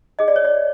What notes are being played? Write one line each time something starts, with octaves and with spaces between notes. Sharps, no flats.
G#4 D#5
D5
C#5
D5